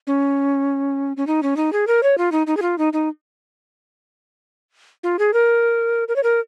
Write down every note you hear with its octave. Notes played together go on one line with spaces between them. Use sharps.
C#4
C#4
D#4
C#4
D#4
G#4
A#4
C#5
F4
D#4
D#4
G#4
F4
D#4
D#4
F4
G#4
A#4
A#4
C#5
A#4